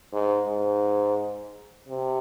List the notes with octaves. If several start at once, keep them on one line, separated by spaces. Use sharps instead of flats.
G#2
G#2
C3